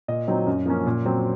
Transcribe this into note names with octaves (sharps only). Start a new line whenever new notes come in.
A#2 D#5
F#3 C4 D#4
F#2
F3 A#3 C#4
A#2
F#3 C4